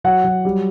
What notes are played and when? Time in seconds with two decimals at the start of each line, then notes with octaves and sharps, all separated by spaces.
0.04 F#3 F#5
0.24 F#3
0.45 G3